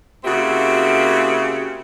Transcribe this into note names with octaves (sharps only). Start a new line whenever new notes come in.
C#3 A#3 C4 E4 F#4 G4